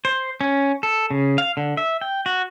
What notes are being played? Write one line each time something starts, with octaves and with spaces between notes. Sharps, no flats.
C5
C#4
A4
C#3
F5
D3
E5
G5
F#4